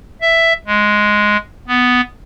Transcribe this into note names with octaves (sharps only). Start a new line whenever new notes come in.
E5
G#3
B3